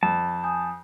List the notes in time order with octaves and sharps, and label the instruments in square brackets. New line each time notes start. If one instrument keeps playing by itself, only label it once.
[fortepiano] F2 [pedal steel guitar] A5
[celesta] G#5 D#6 G6